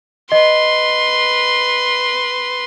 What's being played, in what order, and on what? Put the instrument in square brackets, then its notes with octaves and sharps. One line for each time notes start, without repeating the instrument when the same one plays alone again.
[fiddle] B4 C6 [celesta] D#5